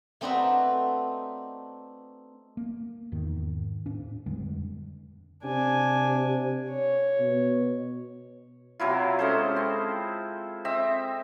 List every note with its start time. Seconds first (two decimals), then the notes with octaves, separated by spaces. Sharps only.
0.21 A3 C4 D4 D#4 F#4 B4
2.57 A#3
3.12 E2 G#2 D#3
3.86 A2 D4
4.26 F2 D3 G3 G#3
5.44 C3 D4 G#5
6.69 C#5
7.20 B2
8.80 C3 F#3 E4 F4
9.19 G#3 C#4 A4 C5
9.56 C4
10.65 C4 D#5 E5